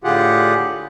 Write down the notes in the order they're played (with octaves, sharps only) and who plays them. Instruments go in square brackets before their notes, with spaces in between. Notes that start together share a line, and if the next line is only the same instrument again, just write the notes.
[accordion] A2 D3 F4 G4 G#4 F#5